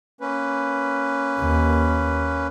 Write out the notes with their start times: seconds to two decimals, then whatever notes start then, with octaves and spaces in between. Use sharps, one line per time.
0.21 A#3 C#4 B4
1.41 D#2